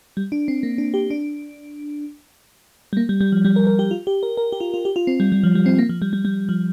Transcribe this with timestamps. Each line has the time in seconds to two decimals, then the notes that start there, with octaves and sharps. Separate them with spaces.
0.17 G3
0.32 D4
0.48 C4
0.63 A#3
0.78 D4
0.94 G4
1.11 D4
2.93 G3
2.97 A#3
3.09 G3
3.21 G3
3.32 F3
3.45 G3
3.56 A#4
3.67 A#4
3.79 G4
3.91 F4
4.07 G4
4.23 A#4
4.37 A#4
4.52 G4
4.60 F4
4.74 F4
4.85 G4
4.96 F4
5.07 C4
5.20 G3
5.32 G3
5.43 F3
5.55 G3
5.66 C4
5.78 A#3
5.89 F3
6.02 G3
6.13 G3
6.25 G3
6.49 F3